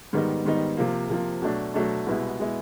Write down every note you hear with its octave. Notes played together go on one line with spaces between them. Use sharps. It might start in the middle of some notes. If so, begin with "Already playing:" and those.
G#2 D#3 G3 B3 D#4
G#2 D#3 G3 B3 D#4
C3 F3 A#3
C3 F3 A#3
B2 F#3 A3 D4
B2 F#3 A3 D4
C2 B2 G#3 B3 E4
B2 G#3 B3 E4